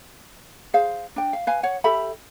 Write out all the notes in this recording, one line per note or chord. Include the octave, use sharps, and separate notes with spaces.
G#4 C5 F5
D4 G5
F5
B4 F5 G#5
C#5 F#5
G4 A4 E5 B5